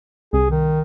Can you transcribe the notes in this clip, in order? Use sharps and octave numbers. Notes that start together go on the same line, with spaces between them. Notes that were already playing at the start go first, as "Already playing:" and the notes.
C2 G#4
D#3